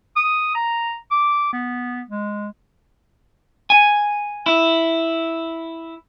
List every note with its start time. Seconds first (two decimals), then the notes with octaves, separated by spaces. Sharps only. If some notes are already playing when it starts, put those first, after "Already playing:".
0.16 D#6
0.55 A#5
1.11 D6
1.53 B3
2.09 G#3
3.70 G#5
4.46 E4